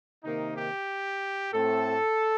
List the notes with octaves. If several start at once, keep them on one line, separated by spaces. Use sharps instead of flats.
C3 D#3 A#3 D#4
G4
A2 A3 C4 A4